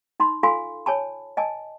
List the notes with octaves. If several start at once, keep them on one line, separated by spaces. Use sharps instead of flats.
D#4 B5 C6
F4 A4 F5 G#5 B5 C6
C#5 G#5 A5 B5
D#5 G#5 A5